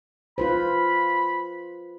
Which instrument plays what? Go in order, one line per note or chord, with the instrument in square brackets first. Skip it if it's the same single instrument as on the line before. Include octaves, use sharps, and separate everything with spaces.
[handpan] F4 B4 C5 [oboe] B5